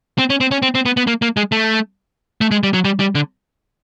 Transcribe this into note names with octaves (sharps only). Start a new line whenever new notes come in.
C4
C#4
C4
C#4
C4
C4
B3
B3
A#3
A#3
G#3
A3
A3
G#3
G3
F#3
G3
G3
D3